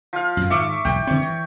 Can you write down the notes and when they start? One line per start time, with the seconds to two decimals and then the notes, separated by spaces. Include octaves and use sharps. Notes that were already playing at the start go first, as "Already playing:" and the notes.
0.13 F3 F5
0.37 F#2 A2
0.50 G#2 D#3 E5 C#6 D6
0.85 B1 E2 G#2 G5
1.07 D3 C4 C#5
1.22 E3